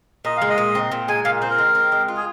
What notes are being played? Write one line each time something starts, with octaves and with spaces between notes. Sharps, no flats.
A#2 D#5
G#3 F5
D#5
A#2
C4
A#2
G#3 G#5
A#2 F5
C4 C5
A#4
G#3
C4
G#3
F4
G#4